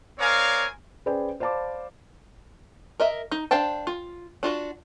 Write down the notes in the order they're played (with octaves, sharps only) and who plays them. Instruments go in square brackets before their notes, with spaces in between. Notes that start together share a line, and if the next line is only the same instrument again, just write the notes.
[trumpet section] C4 A#4 C#5 D5 F5 G#5
[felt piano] C#4 G#4 B4 C5 D5 G5
C5 D5 F5 A5 B5 D6
[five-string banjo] A#4 D#5 E5
D#4
D4 C5 F5 G5 A5
F4
D4 F4 F#4